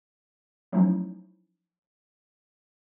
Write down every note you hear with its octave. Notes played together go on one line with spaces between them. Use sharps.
F3 F#3 A3 C#4 D#4 E4